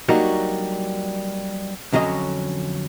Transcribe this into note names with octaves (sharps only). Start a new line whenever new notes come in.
F#3 G3 A#3 D4 D#4 F#4
F2 D3 F#3 C#4 D#5